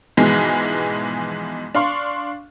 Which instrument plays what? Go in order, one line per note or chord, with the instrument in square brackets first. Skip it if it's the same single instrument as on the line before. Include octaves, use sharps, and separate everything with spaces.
[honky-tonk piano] G#2 B2 E3 F3 G#3 B3
D4 F5 C6 C#6